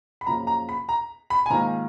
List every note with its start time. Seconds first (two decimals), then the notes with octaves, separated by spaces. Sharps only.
0.21 B5
0.27 F#2 C#3 F3 A#3 A#5
0.47 A#5
0.69 B5
0.89 A#5
1.30 B5
1.46 G#5
1.50 G#2 D#3 A#3 F4 A#5